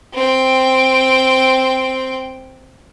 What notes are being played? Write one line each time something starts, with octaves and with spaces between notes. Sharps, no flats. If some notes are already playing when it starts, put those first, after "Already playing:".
C4 G5